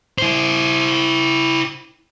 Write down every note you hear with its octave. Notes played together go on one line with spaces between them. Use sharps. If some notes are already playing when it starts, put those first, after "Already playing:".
E4 C5